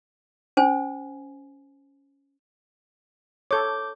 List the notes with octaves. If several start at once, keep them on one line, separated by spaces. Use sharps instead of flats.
C#4 C5 G#5
A4 C#5 D6 G6